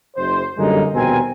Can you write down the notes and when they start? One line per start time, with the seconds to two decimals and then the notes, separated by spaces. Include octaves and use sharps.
0.16 F#1 C5
0.58 F#2 D3 G3 G#3 A#3 D#4
0.94 A#1 D#2 B2 C4 A#4 G#5